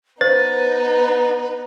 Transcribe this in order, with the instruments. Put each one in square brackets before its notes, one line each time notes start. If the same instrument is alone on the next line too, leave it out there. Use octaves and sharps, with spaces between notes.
[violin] B3 D#4 [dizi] B4 [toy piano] C5 [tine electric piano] A6